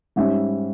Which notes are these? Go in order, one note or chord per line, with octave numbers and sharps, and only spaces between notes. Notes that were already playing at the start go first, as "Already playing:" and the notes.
G#2 G3 C#4 E5